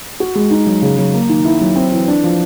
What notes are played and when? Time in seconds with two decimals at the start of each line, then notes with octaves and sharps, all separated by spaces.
0.20 F#4
0.35 G#3
0.51 D#4
0.66 F#3
0.82 C#3
0.98 F#3
1.14 A#3
1.30 D#3
1.45 E4
1.61 F#3
1.76 C4
1.92 E3
2.08 D4
2.24 F3